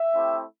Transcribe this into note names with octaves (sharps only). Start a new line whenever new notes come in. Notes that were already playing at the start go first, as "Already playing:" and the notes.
Already playing: E5
A3 C4 E4 G4